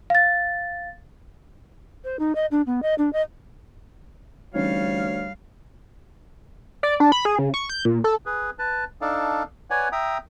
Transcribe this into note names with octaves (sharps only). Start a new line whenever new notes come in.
F5 A6
C5
D#4
D#5
D4
B3
D#5
D4
D#5
D2 E3 G3 C#4 D#4 C#5 F5
D5
D4
B5
G#4
C#3
C#6
G6
A#2
A4
G#4 B4
B4 A5
D4 D#4 A4 D5 F5
B4 C#5 D5 F#5 G#5
E5 G5 A#5 D#6